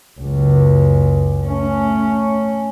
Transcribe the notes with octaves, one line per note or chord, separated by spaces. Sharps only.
F#1 C#2
A3 C#4